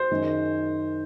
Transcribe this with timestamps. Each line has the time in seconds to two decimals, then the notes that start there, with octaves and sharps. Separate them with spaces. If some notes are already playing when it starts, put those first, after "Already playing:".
Already playing: C5
0.11 F#2 D#3 G#3